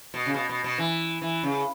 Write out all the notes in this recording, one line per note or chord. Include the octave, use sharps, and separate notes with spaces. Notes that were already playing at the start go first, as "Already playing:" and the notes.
B2
C#3
B2
B2
B2
E3
E3
C#3